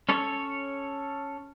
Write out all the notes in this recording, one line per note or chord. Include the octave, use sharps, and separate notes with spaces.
C#4 A4 C#5